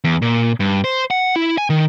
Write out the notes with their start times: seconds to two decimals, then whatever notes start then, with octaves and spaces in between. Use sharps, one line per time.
0.04 E2
0.22 A#2
0.60 G2
0.84 C5
1.11 F#5
1.36 E4
1.58 G#5
1.70 D#3